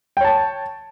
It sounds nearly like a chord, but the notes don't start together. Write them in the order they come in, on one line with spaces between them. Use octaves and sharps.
G5 C#5 A5